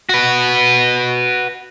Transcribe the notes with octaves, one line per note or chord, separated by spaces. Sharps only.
F#4 B4